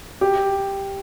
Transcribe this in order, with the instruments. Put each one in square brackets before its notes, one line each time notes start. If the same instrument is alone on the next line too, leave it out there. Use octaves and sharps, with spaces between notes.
[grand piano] G4